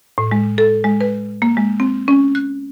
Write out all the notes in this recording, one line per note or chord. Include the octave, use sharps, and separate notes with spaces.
A2
G#3
A4
G#3
B4
A#3
G#3
C4
C#4
F#6